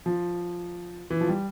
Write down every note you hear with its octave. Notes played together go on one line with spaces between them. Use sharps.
F3
E3
F3
G3